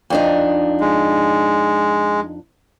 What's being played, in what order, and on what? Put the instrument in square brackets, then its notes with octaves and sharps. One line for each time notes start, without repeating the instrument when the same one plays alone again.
[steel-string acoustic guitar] F2 D4 D#4
[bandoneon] G#3